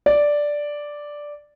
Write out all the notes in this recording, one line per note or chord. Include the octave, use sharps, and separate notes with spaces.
D5